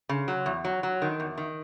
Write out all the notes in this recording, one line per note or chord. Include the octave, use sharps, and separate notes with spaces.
C#3
F#3
E2
F#3
F#3
D#3
E2
D#3